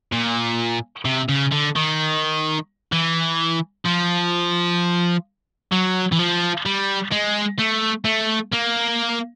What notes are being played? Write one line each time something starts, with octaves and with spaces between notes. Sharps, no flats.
A#2
C3
C#3
D3
D#3
E3
F3
F#3
E3
F3
G3
G#3
A3
A3
A#3